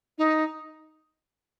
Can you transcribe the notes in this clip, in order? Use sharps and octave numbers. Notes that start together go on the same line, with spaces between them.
D#4